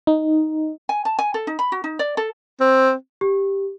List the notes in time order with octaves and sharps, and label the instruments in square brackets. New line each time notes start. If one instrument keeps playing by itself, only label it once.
[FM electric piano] D#4
[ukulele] G#5
A5
G#5
A4
D#4
B5
F#4
D#4
D5
A4
[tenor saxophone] C4
[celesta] G4